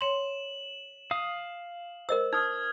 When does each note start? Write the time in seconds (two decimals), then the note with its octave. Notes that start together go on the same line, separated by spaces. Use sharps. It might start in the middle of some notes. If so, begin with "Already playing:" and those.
0.01 C#5 C6 E7 F#7
1.11 F5 D#6
2.09 A#4 C5 D#5 E6
2.33 D#4 D#6 F6 G#6